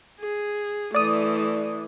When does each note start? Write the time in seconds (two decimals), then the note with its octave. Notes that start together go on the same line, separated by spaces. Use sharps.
0.20 G#4
0.94 E3 A3 D5 D#6